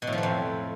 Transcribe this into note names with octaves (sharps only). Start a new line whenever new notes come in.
B2
A2
F3
F#3
F2